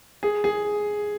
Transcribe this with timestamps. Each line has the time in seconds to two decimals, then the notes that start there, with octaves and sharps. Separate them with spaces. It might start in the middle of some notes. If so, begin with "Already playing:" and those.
0.23 G#4
0.44 G#4